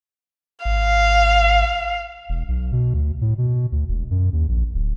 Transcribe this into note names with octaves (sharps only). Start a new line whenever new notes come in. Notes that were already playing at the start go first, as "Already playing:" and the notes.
G#1 F5
E1
B1
B2
D2
A2
B2
D2
E1
F#2
D#2
A#1
D1